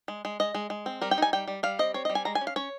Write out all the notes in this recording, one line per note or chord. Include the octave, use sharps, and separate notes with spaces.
G#3
G#3
G#3 D#5
G#3
G#3
C4
G3 A#4
G5
D#4 G#5
G3 G5
G3
G3 F5
C4 D#5
C4 C#5
G3 D#5
G#5
G#3 A#5
G#5
C#4
F5
C#4 C#5